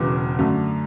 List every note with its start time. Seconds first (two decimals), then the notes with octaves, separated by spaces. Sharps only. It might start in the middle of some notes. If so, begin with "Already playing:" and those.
Already playing: E1 E2 C#3 F#3 B3 D6
0.39 F#2 D3 A3